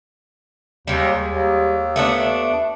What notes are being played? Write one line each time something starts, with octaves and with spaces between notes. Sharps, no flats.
D#2 G3 G#3
D#2
A3 B3 D4